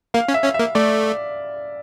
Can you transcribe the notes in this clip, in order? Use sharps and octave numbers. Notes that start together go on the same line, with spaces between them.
A#3 F5
C#4
E5
C#4
A#3 E5
A3 D5